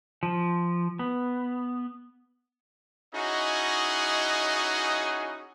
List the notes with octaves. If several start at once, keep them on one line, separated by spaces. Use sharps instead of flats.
F3
B3
C#4 D#4 E4 F#4 G#4 D#5